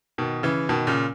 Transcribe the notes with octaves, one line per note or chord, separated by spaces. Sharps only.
B2 D#3
C#3 E3
B2 D#3
A#2 C#3